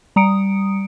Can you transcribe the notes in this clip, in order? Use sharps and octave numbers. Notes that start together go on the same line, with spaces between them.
G3 A#5 D#6 C#7 D7